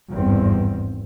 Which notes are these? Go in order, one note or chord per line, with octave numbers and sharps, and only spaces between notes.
G#1 E2 G2 C4